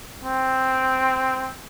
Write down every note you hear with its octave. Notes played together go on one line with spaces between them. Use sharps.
C4